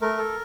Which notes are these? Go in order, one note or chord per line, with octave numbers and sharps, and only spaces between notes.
A3 A#4
A4